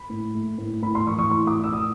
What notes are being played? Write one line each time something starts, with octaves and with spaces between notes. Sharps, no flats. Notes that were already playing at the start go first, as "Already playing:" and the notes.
Already playing: B5
A2
A3
A2
A2 B5
C6
E3 C#6
C#6
A2 C6
D6
A2
E6
D#6